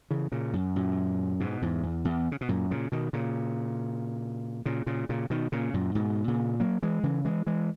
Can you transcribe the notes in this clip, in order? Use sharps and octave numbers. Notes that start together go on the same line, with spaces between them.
C#3 E3
A#2 C#3
F#2
F#2 A#2
G#2 B2
E2 G#2
E2
E2
C#3
B2
F#2 A#2
A#2 C#3
B2 D#3
A#2 C#3
A#2 C#3
A#2 C#3
A#2 C#3
B2 D#3
A#2 C#3
F#2 A#2
G#2 B2
A#2 C#3
F#3 A#3
E3 G#3
C#3 E3
E3 G#3
E3 G#3